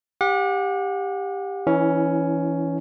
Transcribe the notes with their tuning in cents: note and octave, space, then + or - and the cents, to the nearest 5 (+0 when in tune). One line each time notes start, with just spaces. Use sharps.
G4 +10 F#5 -35
E3 +0 C#4 +10 E4 -35